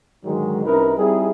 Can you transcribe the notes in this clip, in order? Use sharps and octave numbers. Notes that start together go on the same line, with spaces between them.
G#2 D3 D#3 F#3 G#3
C2 C#4 D#4 E4 A#4 B4
G3 C4 D#4 E4 G#4